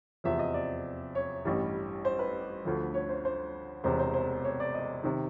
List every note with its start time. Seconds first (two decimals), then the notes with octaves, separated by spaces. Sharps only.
0.24 F1 E2 C3 F3 E5
0.39 D#5
0.54 D5
1.15 C#5
1.45 A1 G2 E3 G3
2.05 C5
2.19 B4
2.65 D2 D3 F3
2.94 C#5
3.09 C5
3.25 C5
3.84 E1 E2 C3 C5
3.99 C5
4.14 C5
4.44 C#5
4.60 D5
4.74 D#5
5.04 C3 D#3